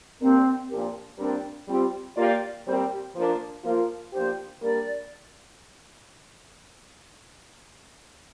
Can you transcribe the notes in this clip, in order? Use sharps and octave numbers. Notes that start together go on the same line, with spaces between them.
C3 A#3 C4 D4 A#4
A#2 F3 D4 G4 A#4
A#2 G3 C4 D4 G4 A#4
G3 C4 F4 G4
A#3 F4 G4 D5
A#2 G3 C4 G4 A#4 C5
G4
F3 A#3 D4
F3 A#3 F4 A#4
F3 A#3 D4 G4 C5
G3 A#3 D4 A#4 D5